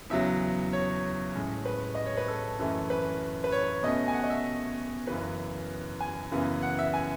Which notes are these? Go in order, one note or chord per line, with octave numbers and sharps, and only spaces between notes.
E2 C#3 F#3 E5
C#5
A2 G#3 C#4
B4
D#5
C#5
B4
A4
F#2 E3 A3 C#4
B4
B4
C#5
B2 A3 C#4 D#5
G#5
F#5
D#5
E5
F#2 C#3 E3 B4
G#5
F#2 C#3 E3 B3
F#5
E5
G#5